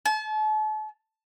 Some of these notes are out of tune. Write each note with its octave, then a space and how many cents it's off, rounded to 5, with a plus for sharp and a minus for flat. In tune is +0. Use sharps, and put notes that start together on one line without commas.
A5 -40